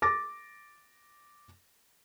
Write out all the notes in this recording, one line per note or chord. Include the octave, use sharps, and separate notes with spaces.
D6 A6 A#6